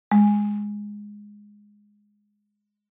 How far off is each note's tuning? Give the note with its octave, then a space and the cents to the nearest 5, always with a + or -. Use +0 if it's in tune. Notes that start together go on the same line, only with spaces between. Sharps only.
G#3 -5